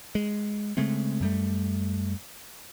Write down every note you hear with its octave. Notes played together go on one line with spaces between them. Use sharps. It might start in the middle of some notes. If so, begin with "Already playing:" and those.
G#3
C#3 G#3 A3 C4
F#2 G3 A3